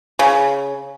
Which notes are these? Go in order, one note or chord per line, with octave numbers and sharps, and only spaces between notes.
C#3